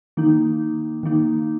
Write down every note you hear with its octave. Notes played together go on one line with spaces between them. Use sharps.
D#3 A#3 D#4
D#3 A#3 D#4